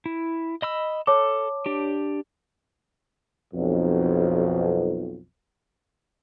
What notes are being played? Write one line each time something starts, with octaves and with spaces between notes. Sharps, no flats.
E4
D#5 B5 E6
A4 C#5 A5 D6
D4 G4
B1 F2